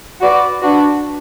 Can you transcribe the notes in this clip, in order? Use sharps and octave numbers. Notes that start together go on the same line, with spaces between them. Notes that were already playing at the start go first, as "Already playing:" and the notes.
F#4 B4 D5
D4 F#4 B4